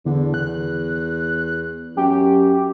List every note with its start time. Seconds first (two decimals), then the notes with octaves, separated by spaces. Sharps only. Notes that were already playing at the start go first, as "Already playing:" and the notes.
0.06 E2 D3
0.34 F#6
1.97 F#2 G4